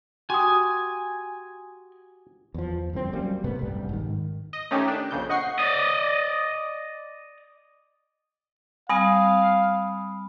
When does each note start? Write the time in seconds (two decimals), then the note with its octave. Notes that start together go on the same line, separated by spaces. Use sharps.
0.30 F#4 G4 G#5 C6 D#6
2.54 E2 F3
2.93 G1 C2 F2 C4
3.13 F#3 G3 A#3 C#4
3.44 G#2 C3 A3 B3
3.59 F#1 C2 G3 B3
3.89 G#2 D#3
4.53 D#5
4.71 D#3 A3 C#4 D#4 G4
4.88 D4
5.11 A#1 F2 C#3 G6
5.29 D#5 F#5 C#6 C7
5.59 D5 D#5
8.89 G3 C4 F5 G#5 B5 D#6